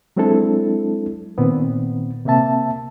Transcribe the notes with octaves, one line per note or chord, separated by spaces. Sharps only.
F#3 G#3 C4 D4 E4 A4
A#2 D#3 B3 C4
C3 A#3 C4 E5 A5